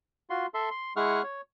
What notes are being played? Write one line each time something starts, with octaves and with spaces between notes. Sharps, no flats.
F4 F#4 C6
A4 E5 C6
C6
G#3 E4 G#4 F#5 C#6 F6
C#5